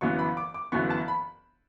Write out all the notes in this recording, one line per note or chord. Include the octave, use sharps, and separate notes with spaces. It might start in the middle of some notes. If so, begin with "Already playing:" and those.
G1 F#2 E3 B3 C#6
B5
D6
D6
G1 F#2 E3 B3 C#6
A5
B5